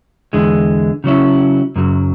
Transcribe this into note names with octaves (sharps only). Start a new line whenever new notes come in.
E2 D3 G#3
C#3 F#3 C#4 E4
F#2 C#3 F#3